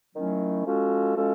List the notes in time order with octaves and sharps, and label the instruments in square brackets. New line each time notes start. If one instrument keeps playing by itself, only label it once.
[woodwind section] D#3 F#3 A3 C#4 E4
F3 G#3 C#4 F#4 A4
F3 G#3 C#4 F#4 A4